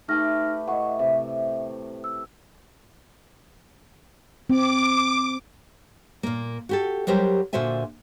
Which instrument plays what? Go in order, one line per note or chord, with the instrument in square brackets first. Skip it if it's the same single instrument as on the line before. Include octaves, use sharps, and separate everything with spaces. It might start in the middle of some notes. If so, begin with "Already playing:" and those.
[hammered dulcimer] A3 G4 B4 [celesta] D#4 F6 A#6
[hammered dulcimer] A2 E5 C#6 [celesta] D#5 F#5
[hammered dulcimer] C3 [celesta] E5
[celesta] E6
[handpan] C4 [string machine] D6
[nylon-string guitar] A#2 A#3
F#4 G4 A4
F#3 G3 G4 A#4 C5
A#2 D3 F#4 C5 E5 G#5